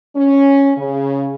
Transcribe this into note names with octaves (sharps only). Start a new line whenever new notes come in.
C#4
C#3